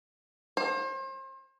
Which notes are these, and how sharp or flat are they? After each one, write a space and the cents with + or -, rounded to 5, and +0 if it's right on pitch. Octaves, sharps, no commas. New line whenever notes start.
C5 +35